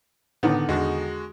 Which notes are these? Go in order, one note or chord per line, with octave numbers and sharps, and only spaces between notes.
A2 D3 D#3 B3
E2 G#3 D4 F#4